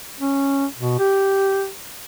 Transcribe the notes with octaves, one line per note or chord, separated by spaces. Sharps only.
C#4
B2
G4